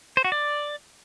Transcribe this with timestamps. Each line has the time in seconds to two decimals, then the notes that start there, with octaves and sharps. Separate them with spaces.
0.17 C5
0.24 F#4
0.32 D5